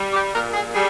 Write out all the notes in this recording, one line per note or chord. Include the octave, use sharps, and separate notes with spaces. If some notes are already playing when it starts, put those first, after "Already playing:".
Already playing: G3
G4
A#2 A#4
G#4
G3 G#4